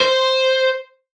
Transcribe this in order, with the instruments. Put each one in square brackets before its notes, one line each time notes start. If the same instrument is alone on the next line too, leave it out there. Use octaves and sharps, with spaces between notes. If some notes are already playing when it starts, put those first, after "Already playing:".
[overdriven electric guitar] C5